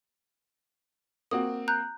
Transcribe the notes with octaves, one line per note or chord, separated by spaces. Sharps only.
A#3 C4 F#4 D#6
A#5 F#6 G6